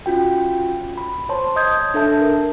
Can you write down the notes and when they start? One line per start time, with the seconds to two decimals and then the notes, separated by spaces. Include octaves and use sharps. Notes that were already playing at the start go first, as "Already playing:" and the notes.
0.06 C#4 F4 F#4 G5
0.98 B5
1.29 C5 C#5 A5 C6
1.56 D#5 D#6 G6 G#6
1.94 D4 A4 E5 A5 G6
2.21 A#4